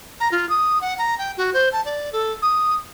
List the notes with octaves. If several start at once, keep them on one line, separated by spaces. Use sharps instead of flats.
A#5
F4
D#6
F#5
A#5
G5
F#4
C5
A5
D5
A4
D#6